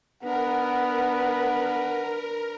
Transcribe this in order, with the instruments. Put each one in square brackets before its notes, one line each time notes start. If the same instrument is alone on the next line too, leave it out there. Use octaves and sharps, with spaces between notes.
[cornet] B3 [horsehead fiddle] D4 B4 [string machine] A#4 [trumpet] F#5